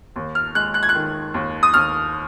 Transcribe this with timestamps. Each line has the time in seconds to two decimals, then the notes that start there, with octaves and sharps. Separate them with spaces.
0.16 D#2
0.35 F6
0.55 G#3 F#6
0.74 F#6
0.83 G#6
0.89 F#6
0.95 D#3
1.34 D#2
1.63 D#6
1.74 D#2 F6